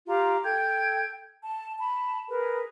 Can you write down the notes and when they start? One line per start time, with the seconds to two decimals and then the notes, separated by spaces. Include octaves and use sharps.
0.07 F4 G4 F5 A#5
0.43 A4 G5 G6 G#6
1.42 A5
1.78 A5 B5
2.29 G#4 A#4 B4